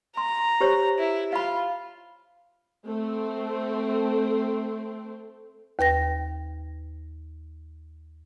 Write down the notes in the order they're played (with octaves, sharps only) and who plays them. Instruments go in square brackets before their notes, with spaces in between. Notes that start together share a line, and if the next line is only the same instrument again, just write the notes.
[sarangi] A#5 [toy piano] C6
[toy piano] G4 C5 C#5
[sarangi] E4
[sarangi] F4 [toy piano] F5 B5
[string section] A3 C4
[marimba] D#2 B4 G5 A#6